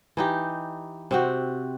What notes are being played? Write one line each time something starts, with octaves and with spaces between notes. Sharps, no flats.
E3 D#4 G4
C3 C4 F#4